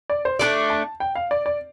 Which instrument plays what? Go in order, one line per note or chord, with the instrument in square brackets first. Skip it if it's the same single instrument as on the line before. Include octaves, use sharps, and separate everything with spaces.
[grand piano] D5
C5
[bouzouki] A3 D4 A4 D5
[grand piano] A5
G5
F5
D5
D5